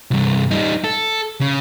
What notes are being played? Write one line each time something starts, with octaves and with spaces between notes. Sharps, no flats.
C2 G2
G3 D#4
A4
C#3